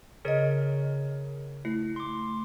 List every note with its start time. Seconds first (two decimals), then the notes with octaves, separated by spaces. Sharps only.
0.25 C#3 G#4 A#4 C#5 D#5
1.65 A3 E4
1.96 C6 D6